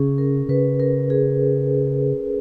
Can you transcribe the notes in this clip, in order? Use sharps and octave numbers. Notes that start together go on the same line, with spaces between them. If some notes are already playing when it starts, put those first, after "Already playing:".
Already playing: C#3 C#4 G#4
A#4
C#3 B4
A#4
G#4